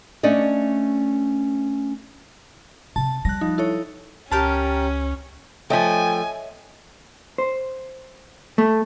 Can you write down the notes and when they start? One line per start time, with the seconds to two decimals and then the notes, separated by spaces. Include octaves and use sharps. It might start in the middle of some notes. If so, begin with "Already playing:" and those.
0.23 A3 C#4 D4 D5 D#5
2.96 C3 A5
3.25 G3 F#6 A#6
3.41 F3 D#4
3.58 E4 A4 C#5
4.32 C#2 C#4 G4 A#4 A5
5.70 F3 A3 C#5 D#5 E5 G5 G#5
7.38 C5
8.58 A3